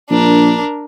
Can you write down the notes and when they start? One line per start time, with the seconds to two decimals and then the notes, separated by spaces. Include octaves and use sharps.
0.10 A#1 D4 A#4